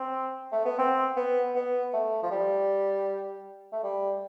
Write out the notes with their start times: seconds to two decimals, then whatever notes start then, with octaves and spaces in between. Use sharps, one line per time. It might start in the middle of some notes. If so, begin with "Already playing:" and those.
Already playing: C4
0.52 A3
0.65 B3
0.79 C4
1.17 B3
1.55 B3
1.93 A3
2.23 F3
2.31 G3
3.72 A3
3.83 G3